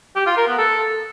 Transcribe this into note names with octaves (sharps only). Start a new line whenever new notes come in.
G4
F4
A#4
B3
A4